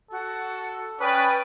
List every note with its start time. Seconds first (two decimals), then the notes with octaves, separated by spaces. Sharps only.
0.11 F#4 A4
1.00 C#4 B4 D5 G5 D#6